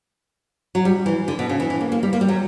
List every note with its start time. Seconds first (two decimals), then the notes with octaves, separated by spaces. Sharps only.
0.75 F#3
0.85 G3
1.06 E3
1.28 D3
1.39 B2
1.49 C#3
1.60 E3
1.70 E3
1.81 A#3
1.92 A#3
2.03 G3
2.13 A#3
2.21 G3
2.28 F#3